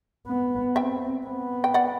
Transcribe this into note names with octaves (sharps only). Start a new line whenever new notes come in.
B3
C4 E5 G5
B3
G5
D5 F#5